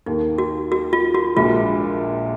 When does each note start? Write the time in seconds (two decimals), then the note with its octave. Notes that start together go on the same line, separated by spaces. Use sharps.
0.06 D#2 D#3 A#3 D#4
0.38 F#4
0.72 F#4
0.93 F4
1.15 F#4
1.37 A#1 A#2 G#3 F4